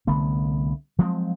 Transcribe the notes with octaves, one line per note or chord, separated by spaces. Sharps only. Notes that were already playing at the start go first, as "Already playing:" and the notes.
C2 D3 A3 B3
F3 F#3 G#3 C4